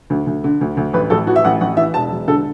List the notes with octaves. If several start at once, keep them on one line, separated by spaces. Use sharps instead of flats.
D2
D2
D3
D2
D2
A1 B4
A1 A4
E3 F#4
E5
A1 F#5
A1 F#5
E3 E5
E1 A5
E1
D3 A4